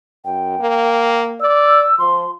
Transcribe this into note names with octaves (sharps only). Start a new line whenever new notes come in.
F#2 G5
A#3
D5 E6
F3 C6